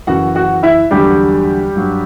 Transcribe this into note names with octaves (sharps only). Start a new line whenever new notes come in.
F#2 C#3 E3 F#4 F#5
F#4 F#5
E4 E5
E2 D3 F#3 G3 G4
G2 F#3